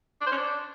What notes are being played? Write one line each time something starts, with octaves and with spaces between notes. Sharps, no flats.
D4
C5
C#4
D4